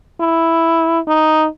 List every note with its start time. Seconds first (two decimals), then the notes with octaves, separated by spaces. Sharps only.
0.20 E4
1.08 D#4